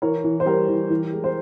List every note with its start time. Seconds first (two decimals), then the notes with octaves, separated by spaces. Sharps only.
0.02 E3 A#4 C#5
0.24 E3
0.40 C5
0.46 G3 G4 A#4
0.68 E3
0.90 E3
1.13 G#3
1.24 C5